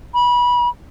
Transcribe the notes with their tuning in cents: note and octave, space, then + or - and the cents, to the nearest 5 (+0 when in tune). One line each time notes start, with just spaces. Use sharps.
B5 -25